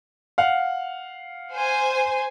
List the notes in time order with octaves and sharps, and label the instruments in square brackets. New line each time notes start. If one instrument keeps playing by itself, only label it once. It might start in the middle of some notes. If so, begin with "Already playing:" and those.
[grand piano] F5 F#5
[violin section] C5 G#5